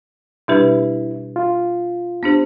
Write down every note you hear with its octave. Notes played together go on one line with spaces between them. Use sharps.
B2 G3 D4 E4 G4 B4
F4
B3 D4 G4 C5